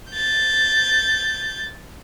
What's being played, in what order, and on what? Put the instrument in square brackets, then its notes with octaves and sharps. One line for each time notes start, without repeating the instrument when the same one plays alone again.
[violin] G6 A6